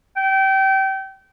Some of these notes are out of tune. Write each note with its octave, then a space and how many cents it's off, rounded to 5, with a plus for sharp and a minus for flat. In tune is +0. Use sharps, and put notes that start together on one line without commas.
G5 -25